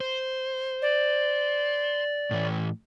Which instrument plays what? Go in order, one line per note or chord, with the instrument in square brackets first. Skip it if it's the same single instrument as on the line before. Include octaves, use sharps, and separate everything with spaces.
[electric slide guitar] C5
[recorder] D5
[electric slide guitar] A2 E3